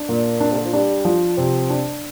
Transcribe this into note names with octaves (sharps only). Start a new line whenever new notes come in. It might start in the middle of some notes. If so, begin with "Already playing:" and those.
Already playing: D4
A#2 A#3
D4
C3
D3
F3
G3 D4
F3
C3 C4
D4